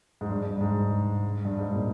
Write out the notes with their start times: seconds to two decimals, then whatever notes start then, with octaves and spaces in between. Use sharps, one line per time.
0.21 G#2
0.30 G2
0.45 G2
0.61 G#2
1.45 G2
1.59 G#2
1.73 A#2